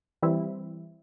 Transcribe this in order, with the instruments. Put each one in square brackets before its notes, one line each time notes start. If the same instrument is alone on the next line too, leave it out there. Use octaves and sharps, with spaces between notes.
[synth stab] E3 G3 C4 E4